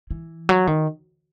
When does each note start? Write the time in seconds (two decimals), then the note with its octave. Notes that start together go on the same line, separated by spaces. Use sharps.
0.11 E3
0.49 F#3
0.67 D#3